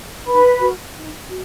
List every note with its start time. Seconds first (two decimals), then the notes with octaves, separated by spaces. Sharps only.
0.26 D#4 B4 B5
0.60 F#4 A#4
0.95 D#4
1.29 F#4